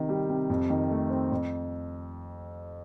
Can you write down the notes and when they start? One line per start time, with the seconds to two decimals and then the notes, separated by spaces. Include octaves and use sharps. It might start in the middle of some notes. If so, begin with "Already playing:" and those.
Already playing: C3 D#3
0.09 G3
0.30 C3
0.50 F2
0.70 D#3
0.91 A3
1.10 C4
1.32 F2